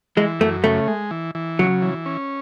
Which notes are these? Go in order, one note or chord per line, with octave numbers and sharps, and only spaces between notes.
E3 G#3
F#2 A3
C#3 A3
G#3
E3
E3
C#3 F#3
E3
C#4